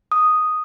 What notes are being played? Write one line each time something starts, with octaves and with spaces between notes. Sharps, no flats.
D#6